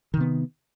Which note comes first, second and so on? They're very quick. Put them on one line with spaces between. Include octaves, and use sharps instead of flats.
D#3 C3 B3